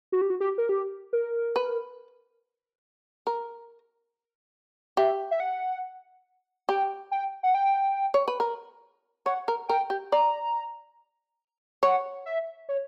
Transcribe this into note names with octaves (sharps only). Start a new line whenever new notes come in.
F#4
G4
F#4
G4
A#4
G4
A#4
B4
A#4
G4 E5
E5
F#5
G4 G5
G5
F#5
G5
C#5
B4
A#4
C#5 F#5
A#4
A#4 G5
G4
D5 A#5
C#5 F#5
E5
C#5